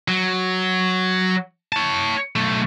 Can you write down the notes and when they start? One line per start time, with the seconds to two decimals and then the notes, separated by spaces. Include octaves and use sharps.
0.08 F#3
1.72 C#5 A5
2.36 B1 A3